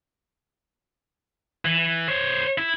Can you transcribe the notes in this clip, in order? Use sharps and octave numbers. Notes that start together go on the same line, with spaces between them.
E3
C5 C#5
E4